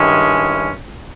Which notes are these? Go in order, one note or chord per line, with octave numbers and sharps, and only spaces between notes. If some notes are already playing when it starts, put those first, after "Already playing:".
Already playing: G2 D#3 G#3 C#4 E4